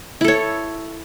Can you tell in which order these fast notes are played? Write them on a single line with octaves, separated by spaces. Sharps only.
E4 A4 C#5